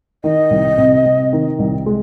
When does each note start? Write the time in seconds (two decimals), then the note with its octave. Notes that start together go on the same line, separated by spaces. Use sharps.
0.24 D#3 D#5
0.50 C2
0.78 C3
1.05 C3
1.33 D#3
1.59 C2
1.86 G#3